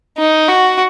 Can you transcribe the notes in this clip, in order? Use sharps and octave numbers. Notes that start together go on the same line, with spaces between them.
D#4
F#4